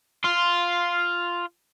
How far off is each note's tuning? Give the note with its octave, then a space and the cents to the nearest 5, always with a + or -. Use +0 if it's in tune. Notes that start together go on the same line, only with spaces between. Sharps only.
F4 +0 C6 +0